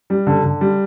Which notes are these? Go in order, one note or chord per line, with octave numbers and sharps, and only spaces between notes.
G3
D3
D3
G3